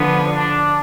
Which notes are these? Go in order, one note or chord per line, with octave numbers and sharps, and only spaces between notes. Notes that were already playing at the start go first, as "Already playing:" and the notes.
Already playing: D3 F3 B3
D4